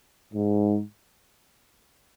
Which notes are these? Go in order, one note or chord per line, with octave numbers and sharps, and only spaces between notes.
G#2